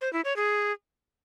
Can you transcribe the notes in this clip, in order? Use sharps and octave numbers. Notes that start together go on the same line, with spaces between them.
C5
E4
C#5
G#4